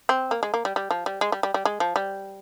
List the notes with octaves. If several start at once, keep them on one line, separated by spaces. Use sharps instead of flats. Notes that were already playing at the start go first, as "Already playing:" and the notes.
C4
A#3
G#3
A#3
G3
G3
F3
G3
G#3
G3
G3
G3
G#3
F3
G3